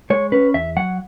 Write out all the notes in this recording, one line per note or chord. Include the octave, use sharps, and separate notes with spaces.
G#3 C#5
C#4 B4
E2 E5
F#3 F#5